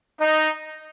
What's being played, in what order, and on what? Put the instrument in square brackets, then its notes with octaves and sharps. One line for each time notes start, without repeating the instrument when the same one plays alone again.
[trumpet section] D#4